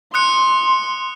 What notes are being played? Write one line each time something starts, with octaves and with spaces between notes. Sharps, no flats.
C6 D#6 F#6 C#7